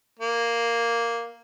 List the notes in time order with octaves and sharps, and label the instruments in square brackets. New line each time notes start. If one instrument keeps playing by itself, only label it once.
[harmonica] A#3